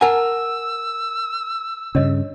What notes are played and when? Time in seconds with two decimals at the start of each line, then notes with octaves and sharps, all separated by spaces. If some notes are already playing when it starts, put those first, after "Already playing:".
0.01 A#4 F#5 G#5 A5 E6
1.95 G2 C#3 D4 C#5 D#5